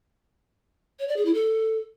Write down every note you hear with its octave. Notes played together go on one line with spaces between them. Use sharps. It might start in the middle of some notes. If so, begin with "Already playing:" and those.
C#5
D5
G#4
E4
A4